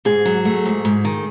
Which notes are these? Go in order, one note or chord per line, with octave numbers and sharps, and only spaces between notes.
G#2 G#4
F#3
A3
G#2
G#2
D#3